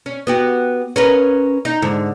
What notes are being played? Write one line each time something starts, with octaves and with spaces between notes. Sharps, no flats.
C#4
B3 F#4 G4
C#4 A#4 B4
D#4
G#2 D3